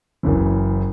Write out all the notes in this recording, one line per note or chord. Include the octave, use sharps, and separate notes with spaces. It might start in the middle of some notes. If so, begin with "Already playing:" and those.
F#1 C#3 E3